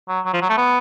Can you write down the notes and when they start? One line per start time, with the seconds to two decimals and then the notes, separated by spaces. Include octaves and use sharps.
0.08 F#3
0.25 F#3
0.33 F3
0.42 F#3
0.49 A3
0.57 B3